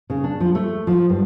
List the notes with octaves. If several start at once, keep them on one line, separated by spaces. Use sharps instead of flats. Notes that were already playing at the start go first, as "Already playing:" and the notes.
C#3
D4
F3
A3
F3
G2